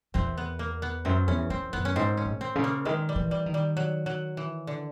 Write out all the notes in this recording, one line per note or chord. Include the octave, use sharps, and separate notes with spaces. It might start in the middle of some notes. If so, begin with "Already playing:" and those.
E2 C4
B3
A#3
B3
F#2 C4
E2 C#4
E2 C4
F#2 B3
C#4
G#2 C4
C#4
A2
C4
C#3
A#3
D#3 G#3
G3
E3
G3
D#3
G3
F#3
F#3
E3
D3